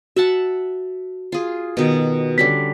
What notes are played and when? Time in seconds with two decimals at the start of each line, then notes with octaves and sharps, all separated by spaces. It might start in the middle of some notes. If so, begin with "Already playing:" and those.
0.16 F#4 E5 F#5 A5
1.32 F4 G#4
1.77 B2 D#3
2.38 D3 G3 C#4 B6